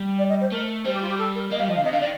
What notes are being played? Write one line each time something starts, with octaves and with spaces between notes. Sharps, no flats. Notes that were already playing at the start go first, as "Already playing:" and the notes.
Already playing: G3
D5
D#5
C5
A3 A#4
G3 C5
G4
F4
G4
A4
A#4
A#3 D#5
G3 F5
F3 D#5
D3 F5
C3 D#5
D3 F5
D#3 D5